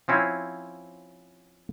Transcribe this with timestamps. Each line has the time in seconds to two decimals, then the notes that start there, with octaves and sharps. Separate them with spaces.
0.08 F3 C4 C#4 E4